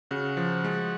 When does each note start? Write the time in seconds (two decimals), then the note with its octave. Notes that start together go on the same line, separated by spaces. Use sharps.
0.11 C#3 F#4
0.37 F3
0.64 G#3